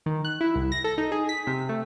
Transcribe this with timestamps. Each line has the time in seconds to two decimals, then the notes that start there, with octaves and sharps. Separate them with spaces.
0.06 D#3
0.25 F#6
0.41 E4
0.55 C2
0.72 A#6
0.84 A4
0.98 D#4
1.12 G#4
1.29 B6
1.47 C3
1.69 A3